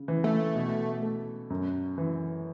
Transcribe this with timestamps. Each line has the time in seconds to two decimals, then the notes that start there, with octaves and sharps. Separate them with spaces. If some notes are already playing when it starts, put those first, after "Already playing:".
Already playing: C#3
0.08 E3
0.24 A3
0.55 B2
1.03 A3
1.50 F#2
1.98 E3